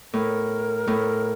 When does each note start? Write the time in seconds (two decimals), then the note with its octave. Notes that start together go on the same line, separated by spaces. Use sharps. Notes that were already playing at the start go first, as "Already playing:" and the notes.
0.13 A2 A#4
0.87 A2